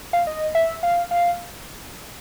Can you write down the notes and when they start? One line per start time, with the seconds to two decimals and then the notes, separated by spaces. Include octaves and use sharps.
0.13 F5
0.27 D#5
0.55 E5
0.83 F5
1.11 F5